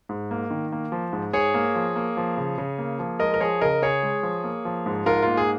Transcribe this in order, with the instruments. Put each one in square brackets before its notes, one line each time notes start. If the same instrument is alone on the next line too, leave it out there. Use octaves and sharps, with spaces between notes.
[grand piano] G#2
A#3
D#3
A#3
F3
G#2
G#2 G#4 C#5
A#3
F3
A#3
F3
C#3
C#3
A#3
F3
G#3 A#4 D#5
A#4
F3 G#4 C#5
C#3 A#4 D#5
C#3 G#4 C#5
G#3
F3
A#3
F3
G#2
G#2 F4 A#4
A#3 F4
G#4